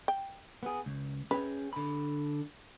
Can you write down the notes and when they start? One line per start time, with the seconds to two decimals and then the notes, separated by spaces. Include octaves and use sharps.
0.08 G5
0.63 B3 G#4
0.86 C#2
1.31 C#4 G#4 B4 G5
1.73 D3 B5